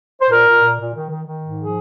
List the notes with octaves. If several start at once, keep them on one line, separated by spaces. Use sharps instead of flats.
C5
A#2 A#4
A#2
A#2
A#2
D#3
D#3
D#3
G#2
F3 G#4